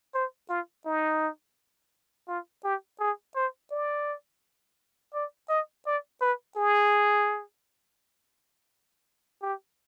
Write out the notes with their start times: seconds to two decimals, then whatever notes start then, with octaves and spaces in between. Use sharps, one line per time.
0.14 C5
0.49 F4
0.85 D#4
2.28 F4
2.64 G4
3.00 G#4
3.35 C5
3.71 D5
5.14 D5
5.49 D#5
5.86 D5
6.21 B4
6.57 G#4
9.42 G4